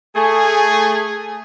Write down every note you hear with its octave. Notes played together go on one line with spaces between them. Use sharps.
A3 G#4